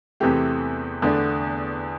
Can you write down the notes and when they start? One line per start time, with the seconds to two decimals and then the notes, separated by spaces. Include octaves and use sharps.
0.20 E2 C3 E3 A3 C4 G4
1.02 E2 D3 A3 D4